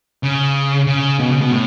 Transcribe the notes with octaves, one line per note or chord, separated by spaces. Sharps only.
C#3
C#3
B2
C#3
B2
A2